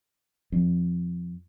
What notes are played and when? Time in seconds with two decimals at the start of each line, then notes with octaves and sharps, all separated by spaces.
0.52 F2